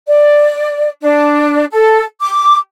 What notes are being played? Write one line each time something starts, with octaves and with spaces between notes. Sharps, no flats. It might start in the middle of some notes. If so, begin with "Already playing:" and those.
D5
D4
A4
D6